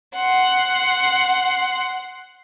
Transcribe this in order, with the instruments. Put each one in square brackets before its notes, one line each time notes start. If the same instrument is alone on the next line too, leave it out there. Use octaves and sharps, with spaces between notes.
[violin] F#5 C6